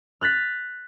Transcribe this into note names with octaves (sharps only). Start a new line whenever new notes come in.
F6 F#6 A6 B6